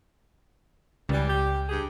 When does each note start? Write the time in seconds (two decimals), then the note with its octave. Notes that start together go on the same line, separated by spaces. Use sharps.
1.09 C#2 E3 G3
1.27 G4
1.69 G2 G4 G#4